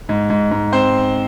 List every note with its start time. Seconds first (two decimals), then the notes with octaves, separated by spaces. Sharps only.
0.09 G#2
0.30 G#2
0.51 G#2
0.72 C4 C5